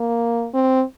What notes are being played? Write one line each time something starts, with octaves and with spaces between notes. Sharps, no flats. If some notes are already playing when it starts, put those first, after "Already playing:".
Already playing: A#3
C4